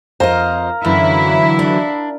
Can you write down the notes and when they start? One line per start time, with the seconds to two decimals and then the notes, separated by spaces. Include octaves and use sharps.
0.20 F2 A#4 C5 D#5 F5 A#5
0.85 F#2 D3 E3 F#3 E4
1.59 D4